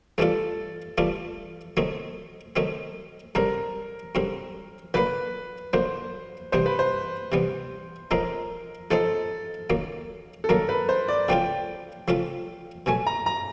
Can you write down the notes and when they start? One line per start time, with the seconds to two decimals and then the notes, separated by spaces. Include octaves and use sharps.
0.18 G2 E3 A3 D4 F4 A4
0.98 G2 E3 A3 D4 F4
1.77 D#3 F#3 A3 C4 D#4
2.56 D#3 F#3 A3 C4 D#4
3.35 F#2 D3 G3 C4 A#4
4.15 F#2 D3 G3 C4
4.94 D3 F#3 A#3 B4
5.73 D3 F#3 A#3 C5
6.52 C3 E3 G3 B3 C5
6.66 B4
6.79 C5
7.32 C3 E3 G3 B3
8.11 A2 F3 G#3 C4 D#4 A#4
8.90 A2 F3 G#3 C4 D#4 A4
9.70 F#2 D#3 F#3 A#3
10.44 A4
10.49 F#2 D#3 F#3 A#3 A#4
10.69 B4
10.89 C5
11.08 D5
11.28 C#3 F3 A3 C#4 F4 G5
12.08 C#3 F3 A3 C#4 F4
12.86 B2 F#3 A3 G#5
13.07 A#5
13.26 A#5